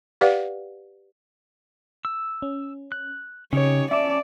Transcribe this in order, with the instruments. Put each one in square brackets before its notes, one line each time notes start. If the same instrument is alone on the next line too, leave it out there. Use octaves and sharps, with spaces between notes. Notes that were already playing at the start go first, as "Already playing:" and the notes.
[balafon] G4 B4 D5 F5 F#5
[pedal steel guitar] E6
[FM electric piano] C#4
[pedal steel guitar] F#6
[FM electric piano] C#3 [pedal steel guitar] C#4 D#4 G4 [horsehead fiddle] C#5
[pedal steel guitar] C#4 A5 [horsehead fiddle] D5 [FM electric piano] E5 D6